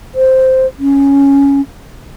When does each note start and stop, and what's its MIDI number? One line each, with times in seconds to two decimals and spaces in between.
0.15 0.67 72
0.79 1.61 61